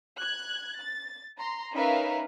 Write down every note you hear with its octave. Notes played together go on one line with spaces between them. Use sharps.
F#6 G#6
A6
A#5 C6
C#4 D#4 A#4 B4 E5 F5